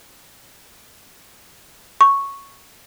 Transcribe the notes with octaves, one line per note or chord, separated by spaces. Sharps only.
C#6